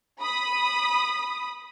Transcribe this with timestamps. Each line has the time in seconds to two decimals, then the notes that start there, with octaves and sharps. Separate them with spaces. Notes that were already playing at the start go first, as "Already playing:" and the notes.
0.21 B5 D#6